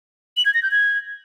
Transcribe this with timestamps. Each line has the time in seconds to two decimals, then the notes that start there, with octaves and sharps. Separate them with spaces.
0.37 F#7
0.46 G#6
0.54 A#6
0.63 G6
0.71 G#6